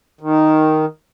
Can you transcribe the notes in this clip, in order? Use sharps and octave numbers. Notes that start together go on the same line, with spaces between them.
D#3